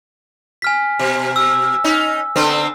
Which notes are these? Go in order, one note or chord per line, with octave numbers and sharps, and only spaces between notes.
G#5 F6 B6
B2
E6
C#4 D#4
D3 B3 C4